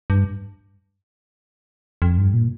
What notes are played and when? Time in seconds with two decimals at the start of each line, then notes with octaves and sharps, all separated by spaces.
0.10 G2
2.02 F2
2.18 G2
2.34 A#2